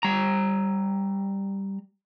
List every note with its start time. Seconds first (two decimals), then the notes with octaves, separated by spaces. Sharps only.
0.03 G3 A#5